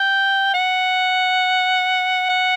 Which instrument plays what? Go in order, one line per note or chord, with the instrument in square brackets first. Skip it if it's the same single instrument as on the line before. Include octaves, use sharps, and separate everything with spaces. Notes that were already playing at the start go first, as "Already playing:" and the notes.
Already playing: [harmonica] G5
F#5
F#5